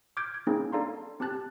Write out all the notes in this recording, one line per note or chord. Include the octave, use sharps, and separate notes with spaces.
D6 F6 G6 G#6 D7
G#6
A#3 C4 C#4 D#4 E4 G#4
D4 A4 D5 F5 A#5 C6
C4 G4 A5 F#6 A6